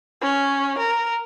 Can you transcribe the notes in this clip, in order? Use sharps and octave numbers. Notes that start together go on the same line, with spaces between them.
C#4
A#4